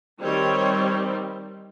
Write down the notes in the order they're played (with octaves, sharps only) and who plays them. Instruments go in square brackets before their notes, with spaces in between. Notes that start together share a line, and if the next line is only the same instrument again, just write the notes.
[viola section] D#3 G3 C4 C#5